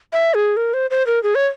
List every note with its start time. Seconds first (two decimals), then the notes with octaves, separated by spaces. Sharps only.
0.13 E5
0.34 G#4
0.57 A#4
0.74 C5
0.91 C5
1.07 A#4
1.23 G#4
1.35 C#5